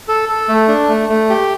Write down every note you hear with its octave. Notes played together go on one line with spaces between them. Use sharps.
A4
A4
A3
D4
A3
A3
G4